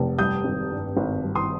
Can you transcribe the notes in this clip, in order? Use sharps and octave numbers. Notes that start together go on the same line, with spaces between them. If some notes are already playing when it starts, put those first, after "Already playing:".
Already playing: F1
G3 D#6 G6
G#1
G2
G#1
G3
C6 D#6